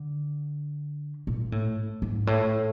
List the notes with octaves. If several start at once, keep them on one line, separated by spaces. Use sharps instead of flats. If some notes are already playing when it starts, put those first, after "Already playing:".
Already playing: D3
A#2
A2
G#2
A2